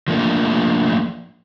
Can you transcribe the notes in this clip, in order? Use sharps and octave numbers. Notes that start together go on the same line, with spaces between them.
F3 A3 A#3 D4